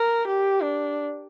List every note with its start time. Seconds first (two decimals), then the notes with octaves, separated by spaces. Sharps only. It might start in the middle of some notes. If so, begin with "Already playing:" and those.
Already playing: A#4
0.27 G4
0.62 D4